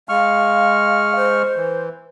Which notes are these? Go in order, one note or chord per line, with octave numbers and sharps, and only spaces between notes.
G#3 F5 C#6 F6
C5
E3